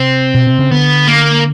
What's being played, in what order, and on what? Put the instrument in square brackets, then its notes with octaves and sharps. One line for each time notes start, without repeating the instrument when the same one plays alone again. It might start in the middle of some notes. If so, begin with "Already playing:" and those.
Already playing: [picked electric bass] C3 [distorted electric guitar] C4
[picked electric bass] B2
C3
C#3
[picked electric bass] D3 [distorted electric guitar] B3
[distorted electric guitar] A#3